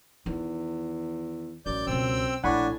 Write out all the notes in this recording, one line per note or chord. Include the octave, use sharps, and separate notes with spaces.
E2 D#3
A1 F#2 D5 G6
C#2 B2 C4 G5 E6
A#1 A2 D4 F#5 G#5 B5 C#6